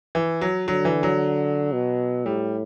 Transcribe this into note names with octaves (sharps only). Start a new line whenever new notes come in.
E3
F#3
D3 F#3
E3
F#3
B2
A2 G3